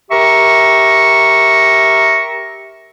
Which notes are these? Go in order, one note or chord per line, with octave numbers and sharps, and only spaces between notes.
G4 A#4 E5 A#5 C#6